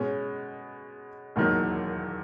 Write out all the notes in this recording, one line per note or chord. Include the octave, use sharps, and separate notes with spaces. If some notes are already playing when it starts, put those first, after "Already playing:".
Already playing: B2 G#3 C#4
E1 D#2 D#3 F#3